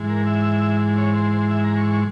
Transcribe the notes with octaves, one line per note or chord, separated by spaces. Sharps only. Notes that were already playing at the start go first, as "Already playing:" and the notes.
Already playing: G#2 E3 G#3
A#4
E5
C#5
C5
C5
E5
A#5
C#6
C#6